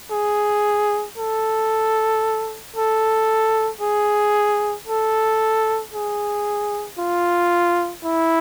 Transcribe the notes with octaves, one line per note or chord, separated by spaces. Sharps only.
G#4
A4
A4
G#4
A4
G#4
F4
E4